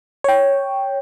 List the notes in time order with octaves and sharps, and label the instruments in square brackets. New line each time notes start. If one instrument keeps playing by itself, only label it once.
[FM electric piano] C#5 G5